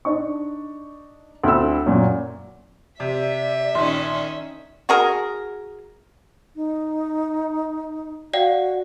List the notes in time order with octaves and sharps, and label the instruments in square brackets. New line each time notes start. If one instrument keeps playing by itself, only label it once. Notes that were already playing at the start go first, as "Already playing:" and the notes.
[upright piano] D4 D#4 C#6
D2 C4 B5 E6
F#2 A#2 F#3
[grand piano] C3 [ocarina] D5 [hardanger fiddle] E5
[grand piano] A#1 C6 [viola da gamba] D#3 C#4
[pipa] F#4 G#4 A#4
[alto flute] D#4
[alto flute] F#4 [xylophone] D5 F5 G5